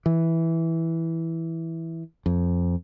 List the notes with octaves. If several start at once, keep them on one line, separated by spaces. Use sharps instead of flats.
E3
F2